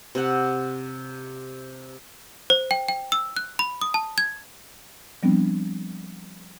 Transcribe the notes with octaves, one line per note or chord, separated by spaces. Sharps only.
C3 F#5
C5
G5
G5
E6
F#6
B5
D#6
A5
G#6
F3 G3 B3 C4 D4